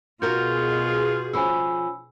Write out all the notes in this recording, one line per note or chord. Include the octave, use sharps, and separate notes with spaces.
B2 F4 F#4 G#4 A#4 G6
F3 C#4 G#5 B5 E6